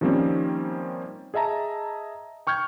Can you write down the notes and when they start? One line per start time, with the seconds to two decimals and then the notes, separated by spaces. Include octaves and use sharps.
0.01 D#3 F3 G3 A#3 C4 C#4
1.34 G#4 D#5 E5 A5 A#5
2.47 G5 C#6 F6 G6 G#6